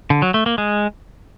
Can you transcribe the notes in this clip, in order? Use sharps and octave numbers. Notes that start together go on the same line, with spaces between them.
D3
F#3
A3
A#3
G#3